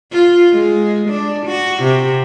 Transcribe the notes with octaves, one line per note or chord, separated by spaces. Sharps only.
F4
G#3
D4
F#4
C3